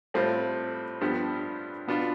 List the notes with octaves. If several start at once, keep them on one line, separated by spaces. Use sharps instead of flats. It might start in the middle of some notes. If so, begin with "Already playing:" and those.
A2 G3 C4 F4
G2 F3 B3 D4 G4
B2 B3 D4 F4